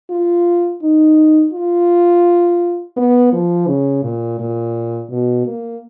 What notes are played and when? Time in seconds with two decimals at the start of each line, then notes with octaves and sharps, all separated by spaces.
0.10 F4
0.83 D#4
1.53 F4
2.97 B3
3.33 F3
3.67 C#3
4.04 A#2
4.39 A#2
5.10 B2
5.46 A#3